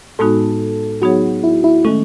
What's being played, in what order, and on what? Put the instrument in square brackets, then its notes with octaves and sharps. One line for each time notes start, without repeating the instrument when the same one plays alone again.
[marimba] A2 G#3 B3 D#4 F#4 [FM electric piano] A4
[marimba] F#3 B3 D#4 G#4 C#5 [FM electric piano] F#4
[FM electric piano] E4
E4
[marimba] D#3 G#3 C#4 [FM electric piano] A3